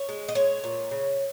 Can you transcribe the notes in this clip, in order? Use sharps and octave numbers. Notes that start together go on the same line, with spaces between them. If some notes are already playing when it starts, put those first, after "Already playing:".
Already playing: C#5
G#3
D#5
G#3 C#5
A#2
C#3